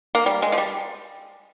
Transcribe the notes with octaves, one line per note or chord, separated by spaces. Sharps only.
A#3
G3
G#3
F3
G3